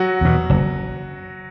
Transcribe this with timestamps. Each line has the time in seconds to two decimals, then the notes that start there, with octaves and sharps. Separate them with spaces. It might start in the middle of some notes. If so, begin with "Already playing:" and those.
Already playing: F#3 F#4
0.21 E2 B2
0.50 F#1